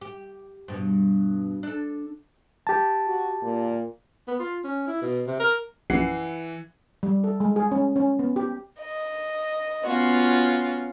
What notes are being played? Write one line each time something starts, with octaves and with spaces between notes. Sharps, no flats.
G4
G2 B2
D4 A4
G4 A5
F#4
A#2
B3
F4
C#4
E4
B2
C3
A#4
A#1 F#2 E3 F#5 C7
G3
A4
G#3
G#4
C#4
C#4
B3
G4
D#5
B3 C#4 F4 F#4